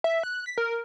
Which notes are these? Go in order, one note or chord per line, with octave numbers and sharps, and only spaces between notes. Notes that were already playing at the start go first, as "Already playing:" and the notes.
E5
F#6
B6
A#4